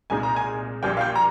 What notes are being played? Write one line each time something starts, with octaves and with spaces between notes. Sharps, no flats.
C2 A#2 G#3 D#4 G#5
A#5
G#5
A#1 A#2 G3 G5
F5
G5
A#5